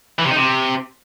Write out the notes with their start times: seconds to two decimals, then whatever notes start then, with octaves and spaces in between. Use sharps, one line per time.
0.19 E3
0.25 C3
0.31 D#4
0.37 C3